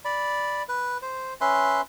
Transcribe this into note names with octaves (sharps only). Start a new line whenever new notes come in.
D5 B5
B4
C5
C#4 B4 E5 C6